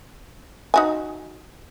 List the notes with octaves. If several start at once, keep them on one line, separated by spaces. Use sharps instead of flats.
D#4 F#4 G#5